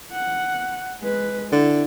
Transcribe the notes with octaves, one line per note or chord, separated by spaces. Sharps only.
F#5
G#3 B4
D3 E4